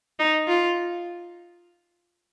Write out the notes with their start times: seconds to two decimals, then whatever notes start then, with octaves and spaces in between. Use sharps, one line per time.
0.19 D#4
0.48 F4